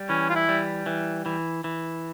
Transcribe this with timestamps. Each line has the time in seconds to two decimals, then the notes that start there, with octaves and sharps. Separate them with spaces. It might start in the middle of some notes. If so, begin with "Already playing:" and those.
Already playing: G3
0.09 E3 C#4
0.30 F4
0.35 E4
0.49 G3
0.86 E3
1.26 E3
1.64 E3